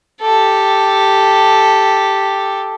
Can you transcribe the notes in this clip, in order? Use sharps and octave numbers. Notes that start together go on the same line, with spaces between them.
G4 A4